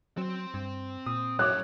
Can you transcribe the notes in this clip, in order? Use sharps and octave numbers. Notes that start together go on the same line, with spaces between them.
F#3 C4 C5
G2
A#2 D#6
F#2 A2 C#5 D6 F#6